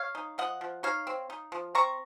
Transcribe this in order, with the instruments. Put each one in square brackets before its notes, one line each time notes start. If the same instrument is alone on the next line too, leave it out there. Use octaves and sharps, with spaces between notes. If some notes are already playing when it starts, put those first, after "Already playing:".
Already playing: [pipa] C#5 F5
D#4
F3 D#5 F#5
F3
D#4 C#5 F5
C4
D#4
F3
C4 A#5 C#6